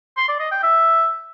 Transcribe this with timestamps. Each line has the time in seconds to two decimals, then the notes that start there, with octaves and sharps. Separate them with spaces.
0.17 C6
0.28 D5
0.40 D#5
0.51 G5
0.63 E5